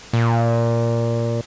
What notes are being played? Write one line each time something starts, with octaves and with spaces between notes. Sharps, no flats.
A#2